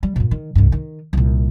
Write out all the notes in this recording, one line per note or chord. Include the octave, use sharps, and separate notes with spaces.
G3
G2 A#2
D#3
C2 G2
D#3
C2 A#2